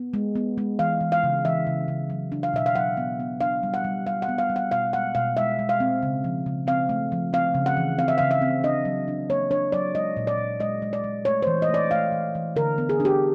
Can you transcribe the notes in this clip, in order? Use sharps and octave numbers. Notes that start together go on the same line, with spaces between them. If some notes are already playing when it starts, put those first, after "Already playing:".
Already playing: B3
G#3
B3
G#3
E3 F5
E3
F5
C#3
E3 E5
C#3
C#3
F#3
D4
F5
B2 E5
F5
F#3 F#5
B3
B3
D4 F5
G3
F#5
G3
G3 F5
F#5
B3
F5
G3
F#5
B2 F5
G#3 F#5
B2 F5
G#3 E5
G#3
F5
C4
C#3
F3
C#3
C4 F5
A3
F3
C4 F5
C#3
F#5
E3
C4 F5
E5
C#3 F5
E5
C4
D4 D#5
F#3
D4
A#3 C#5
D4 C#5
F#3 D5
G#3 D#5
A#2
D5
A#2
G#3 D#5
G#3
D5
G#3
A3 C#5
C5
E3
D#5
A3
D5
A3 F5
E3
E3
D3 A#4
B3
G#4
D4
G4